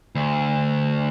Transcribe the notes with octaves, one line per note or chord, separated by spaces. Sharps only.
D2